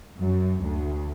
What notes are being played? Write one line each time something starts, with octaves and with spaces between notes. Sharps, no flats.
F#2
D2